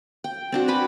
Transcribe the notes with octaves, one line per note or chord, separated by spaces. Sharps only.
G5
C4 D4 F#4
B4 G#5 B5 D6